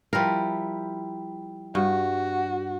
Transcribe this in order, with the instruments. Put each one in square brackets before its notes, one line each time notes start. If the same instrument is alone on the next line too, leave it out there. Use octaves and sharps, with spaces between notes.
[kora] F3 A#4 [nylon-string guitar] G3 E4
[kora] G2 [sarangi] F#4